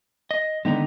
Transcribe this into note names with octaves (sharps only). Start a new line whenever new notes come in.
D#5
D3 D#3 G#3 B3 D#4 A#5